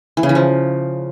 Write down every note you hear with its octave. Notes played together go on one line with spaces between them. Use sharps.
E3
C#3
E3
F3